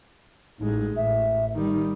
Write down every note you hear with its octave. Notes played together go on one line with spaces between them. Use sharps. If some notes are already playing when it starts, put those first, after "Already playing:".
A1 G#3 D#4
A1 E5
D#3 G3 D#4